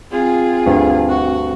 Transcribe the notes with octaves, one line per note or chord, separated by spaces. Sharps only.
C4 F4 G#4
D2 G2
F#4